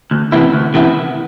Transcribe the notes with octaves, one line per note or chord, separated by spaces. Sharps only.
D2
C3 E3 B3 E4
D2
C3 E3 B3 E4